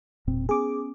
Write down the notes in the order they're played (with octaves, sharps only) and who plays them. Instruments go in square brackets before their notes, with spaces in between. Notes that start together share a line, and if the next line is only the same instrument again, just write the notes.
[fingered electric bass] E1 A#2 C4
[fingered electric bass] B3 C#4 [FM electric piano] G#4 D6